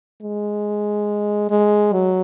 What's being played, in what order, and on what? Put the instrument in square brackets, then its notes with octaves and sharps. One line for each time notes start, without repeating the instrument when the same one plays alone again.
[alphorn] G#3
G#3
F#3